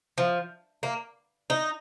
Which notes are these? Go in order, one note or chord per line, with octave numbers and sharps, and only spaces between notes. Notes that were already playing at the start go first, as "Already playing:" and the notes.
F3
A#3
D#4